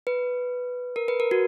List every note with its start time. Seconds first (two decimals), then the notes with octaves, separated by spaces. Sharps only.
0.07 B4
0.96 A#4
1.08 B4
1.20 A#4
1.31 F#4